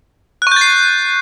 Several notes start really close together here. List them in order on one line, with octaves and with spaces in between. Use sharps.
F#6 C#6 G6 A6 C7